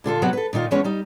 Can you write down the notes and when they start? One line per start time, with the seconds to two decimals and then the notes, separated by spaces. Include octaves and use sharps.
0.04 A#2 D3 F4 A4
0.22 C3 F#3 B3 F#4 B4 F#5
0.33 A4 B4
0.53 A#2 D#3 D#4 F4
0.71 E3 F3 G#3 B3 C#4 C#5
0.84 G3 D#4